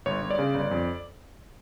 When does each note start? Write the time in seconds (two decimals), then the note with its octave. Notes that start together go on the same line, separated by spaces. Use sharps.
0.06 G1 C#5
0.22 G1
0.31 D5
0.39 C#3
0.54 G1
0.71 F2